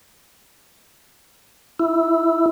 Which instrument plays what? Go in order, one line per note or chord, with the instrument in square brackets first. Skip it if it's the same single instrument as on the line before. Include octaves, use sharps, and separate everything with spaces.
[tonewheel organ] E4